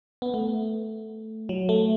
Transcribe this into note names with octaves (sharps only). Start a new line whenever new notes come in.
B3
A3
F#3
A3